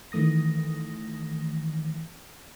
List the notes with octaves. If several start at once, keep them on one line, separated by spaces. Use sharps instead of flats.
D#3 E3 A3 D#6 A#6